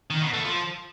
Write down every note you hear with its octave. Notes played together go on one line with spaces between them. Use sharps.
D#3
B2
A3
F3